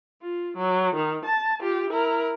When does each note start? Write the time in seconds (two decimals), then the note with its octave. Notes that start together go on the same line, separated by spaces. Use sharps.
0.22 F4
0.57 F#3
0.95 D#3
1.25 A5
1.60 F4 G4
1.90 E4 A#4